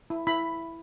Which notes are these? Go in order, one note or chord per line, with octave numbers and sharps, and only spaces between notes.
E4
E4 B5